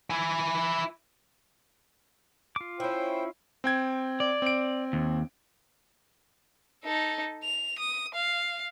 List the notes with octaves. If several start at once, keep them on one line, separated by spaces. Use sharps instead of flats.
E4 G#5
F4 D6
C#4 E4 C5 G5
C4 G5 G#6
D5
C4 D7
D#2
D#4 A4
F7
D#6
F5